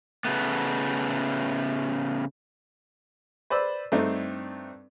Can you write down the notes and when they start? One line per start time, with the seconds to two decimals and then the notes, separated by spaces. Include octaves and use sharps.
0.25 C#3 A3 B3
3.50 B4 C5 D5 B5 E6
3.92 G2 A3 C4 D4 D#4